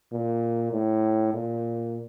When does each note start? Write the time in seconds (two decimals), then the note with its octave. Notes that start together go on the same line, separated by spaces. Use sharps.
0.12 A#2
0.72 A2
1.34 A#2